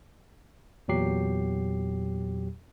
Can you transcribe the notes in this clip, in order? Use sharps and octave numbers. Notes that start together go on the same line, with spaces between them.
E2 A#2 F#3 G4 C7